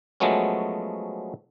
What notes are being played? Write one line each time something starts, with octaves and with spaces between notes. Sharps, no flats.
F3 F#3 G#3 A3 B3 C#4